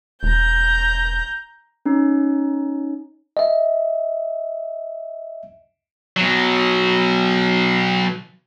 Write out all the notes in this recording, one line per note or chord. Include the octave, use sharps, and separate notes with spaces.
E1 A#5 G6
C#4 D#4
D#5 E5
B2 F#3